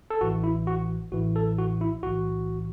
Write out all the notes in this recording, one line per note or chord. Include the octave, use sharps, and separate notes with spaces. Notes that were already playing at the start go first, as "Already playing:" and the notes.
A4
A1 A2 E3 F#4
E4
F#4
A1 A2 E3 F#4
A4
F#4
E4
B1 A2 E3 F#4